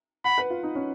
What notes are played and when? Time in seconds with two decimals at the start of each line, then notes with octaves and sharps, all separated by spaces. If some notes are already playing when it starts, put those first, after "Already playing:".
0.25 F#5 B5
0.38 B4
0.50 F4
0.63 D#4
0.75 C#4